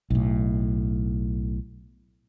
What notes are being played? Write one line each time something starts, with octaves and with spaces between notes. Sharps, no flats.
B1 A2